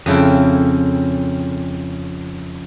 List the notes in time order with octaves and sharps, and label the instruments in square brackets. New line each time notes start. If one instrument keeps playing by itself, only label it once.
[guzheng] F2 C#3 E4 G5